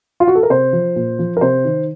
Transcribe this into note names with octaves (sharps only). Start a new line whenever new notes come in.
F4
F#4
A4
A#4
C3 C5
F3
A#2
F3
A#4
C3 C5
D#3